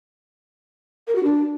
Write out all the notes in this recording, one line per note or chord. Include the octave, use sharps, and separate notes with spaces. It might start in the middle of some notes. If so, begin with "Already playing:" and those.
A#4
F#4
D4